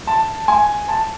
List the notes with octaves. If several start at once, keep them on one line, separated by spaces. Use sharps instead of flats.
A5
G#5
A5